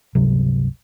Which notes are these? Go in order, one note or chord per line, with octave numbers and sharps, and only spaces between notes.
G1 C#2 C3 F#3